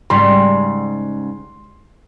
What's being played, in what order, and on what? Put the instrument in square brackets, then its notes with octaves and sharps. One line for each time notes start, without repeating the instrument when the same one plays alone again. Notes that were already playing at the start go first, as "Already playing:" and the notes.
[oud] G#2 C#3 G3 [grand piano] C6